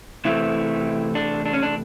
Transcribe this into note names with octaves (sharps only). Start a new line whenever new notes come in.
C3 E3 A3 C4 E4
D4
D4
C#4
D4